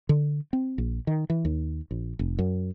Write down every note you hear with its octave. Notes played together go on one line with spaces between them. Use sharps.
D3
C4
A#1
D#3
E3
D#2
A#1
F1
F#2